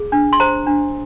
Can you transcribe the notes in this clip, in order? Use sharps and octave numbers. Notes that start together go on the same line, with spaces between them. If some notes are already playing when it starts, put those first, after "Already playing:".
Already playing: G#4
D4
C6
C5 A#5
D4